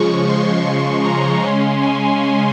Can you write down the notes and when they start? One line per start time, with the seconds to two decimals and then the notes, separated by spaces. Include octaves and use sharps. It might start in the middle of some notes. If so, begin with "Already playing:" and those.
Already playing: C#3 F3 G#3 C#6
0.29 C6
1.05 A#5
1.44 C#3 G#3 C#4 C6
1.82 G#5